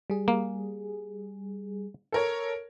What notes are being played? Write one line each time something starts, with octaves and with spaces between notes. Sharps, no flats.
G3 G#4
A#3
A4 A#4 C#5